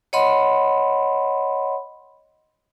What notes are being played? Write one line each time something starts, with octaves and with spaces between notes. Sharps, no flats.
C#5 D#5 F#5 B5 C6